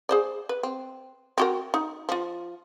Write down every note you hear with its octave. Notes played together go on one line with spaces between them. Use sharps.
G#4 C5 D5
B4
C4
C4 F#4 A#4
D#4
F3 F4